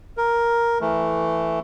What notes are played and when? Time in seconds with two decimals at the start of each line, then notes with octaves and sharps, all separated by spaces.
0.17 A#4
0.81 E3 A3